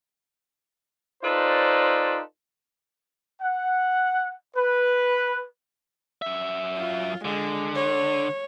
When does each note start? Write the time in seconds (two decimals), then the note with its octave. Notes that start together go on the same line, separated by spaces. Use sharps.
1.23 D#4 F4 A4 B4 C5 D5
3.42 F#5
4.57 B4
6.22 F#2 E5
6.77 F4
7.25 D3 G#3
7.76 C#5